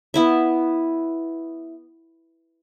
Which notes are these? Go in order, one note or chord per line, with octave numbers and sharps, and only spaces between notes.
B3 E4 E5